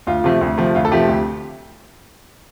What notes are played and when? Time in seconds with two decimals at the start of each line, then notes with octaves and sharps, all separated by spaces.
0.07 D2 F4
0.24 C3 F3 A3
0.41 D2
0.58 C3 F3 A3
0.75 D2 F4
0.85 A4
0.92 C3 F3 A3 G4
1.09 D2